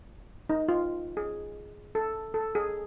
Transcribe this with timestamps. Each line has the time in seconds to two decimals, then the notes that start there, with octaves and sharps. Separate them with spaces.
0.50 D#4
0.68 F4
1.17 G#4
1.95 A4
2.34 A4
2.55 G#4